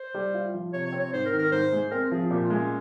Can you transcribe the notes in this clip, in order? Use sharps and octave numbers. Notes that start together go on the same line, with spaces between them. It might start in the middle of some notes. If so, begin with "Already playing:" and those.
Already playing: C5
G3
F4
F3
C3 C#5
C#5
C4
C#5
G#2 C5
A#4
D#3
A#4
G#2 C5
G#3
C4 A#4
F3 G#4
A#2 G4
F4
G#3
C#4